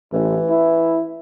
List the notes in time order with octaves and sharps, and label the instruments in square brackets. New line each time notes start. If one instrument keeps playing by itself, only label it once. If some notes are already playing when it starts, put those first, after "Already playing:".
[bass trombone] A1 [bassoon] E3
[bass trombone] E4